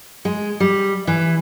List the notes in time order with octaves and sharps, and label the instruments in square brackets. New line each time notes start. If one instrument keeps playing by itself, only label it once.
[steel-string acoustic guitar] G#3
G3
E3